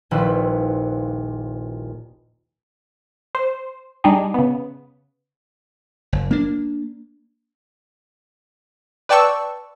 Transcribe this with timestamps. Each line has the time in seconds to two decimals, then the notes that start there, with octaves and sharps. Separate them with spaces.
0.11 D#1 A#1 A#2 E4 B4 C5
3.35 C5
4.04 G3 D4 D#4 G4 G#4
4.34 C#3 B3
6.13 F#1
6.31 A#3 D4
9.09 B4 D5 G5 A5 C#6 E6